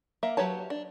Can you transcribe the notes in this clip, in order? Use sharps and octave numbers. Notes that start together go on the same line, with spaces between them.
A#3 E5
F#3 G4 B4 C#5 A5
D4